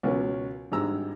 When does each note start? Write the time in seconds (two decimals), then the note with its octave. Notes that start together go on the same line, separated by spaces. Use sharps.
0.03 C#2 B2 C#4 A#4 B4
0.72 G#1 G2 G#3 G4 A#5 E6